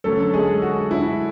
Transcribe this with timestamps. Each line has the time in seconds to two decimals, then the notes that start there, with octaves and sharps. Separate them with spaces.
0.04 D3 F#3 A3 C#4 A4
0.34 G#3 G#4
0.62 F#4
0.91 E4